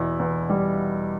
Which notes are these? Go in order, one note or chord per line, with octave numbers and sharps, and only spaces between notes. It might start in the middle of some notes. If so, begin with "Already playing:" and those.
Already playing: E2 B2 E4
E2
G3